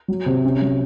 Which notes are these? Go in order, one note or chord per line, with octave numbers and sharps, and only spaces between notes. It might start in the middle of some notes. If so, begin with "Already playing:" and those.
F#3
C3
C#4
F#3